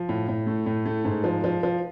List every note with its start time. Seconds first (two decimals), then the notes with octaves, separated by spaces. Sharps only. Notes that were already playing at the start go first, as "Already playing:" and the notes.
Already playing: F3
0.09 A2
0.28 A2
0.47 A3
0.66 A2
0.86 A3
1.05 G#2
1.24 F3
1.44 F3
1.63 F3